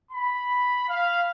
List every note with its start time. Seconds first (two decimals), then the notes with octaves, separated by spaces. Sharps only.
0.12 B5
0.88 F5